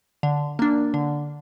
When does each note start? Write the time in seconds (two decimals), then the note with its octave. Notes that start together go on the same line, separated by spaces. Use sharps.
0.23 D3
0.59 A#3 D4
0.94 D3